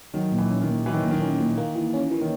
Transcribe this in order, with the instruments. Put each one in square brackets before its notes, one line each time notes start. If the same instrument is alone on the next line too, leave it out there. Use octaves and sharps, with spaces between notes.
[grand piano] D#3 [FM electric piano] F#3
[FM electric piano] A#2
[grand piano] E3
[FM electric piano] C#4
[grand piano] D#3
[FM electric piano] A#2
[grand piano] E3 [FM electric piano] F#3
[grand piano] D#3
[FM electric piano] A#2
[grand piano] D#3
[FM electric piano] C#4
A#2
A#3
E3
C#4
E3
[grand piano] D#3